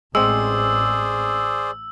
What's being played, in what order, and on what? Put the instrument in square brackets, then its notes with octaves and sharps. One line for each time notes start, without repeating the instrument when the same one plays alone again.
[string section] A1 [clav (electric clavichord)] G#3 C4 [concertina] G#4 C5 D5 [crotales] E6